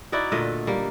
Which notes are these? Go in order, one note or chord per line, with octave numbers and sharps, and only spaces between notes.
D#4 E4 F#4 D5
A#2 D3 A3 D#5
G3 A#3